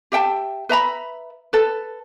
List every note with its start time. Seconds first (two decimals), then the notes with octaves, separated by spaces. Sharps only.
0.12 G4 E5 G5 A5
0.69 B4 E5 A#5 B5
1.53 A4 B4